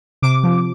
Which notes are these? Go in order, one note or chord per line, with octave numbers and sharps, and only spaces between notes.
C3 D6
F3